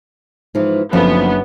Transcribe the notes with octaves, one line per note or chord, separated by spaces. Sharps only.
G#2 E3 F3
F#1 F#2 D3 F3 B3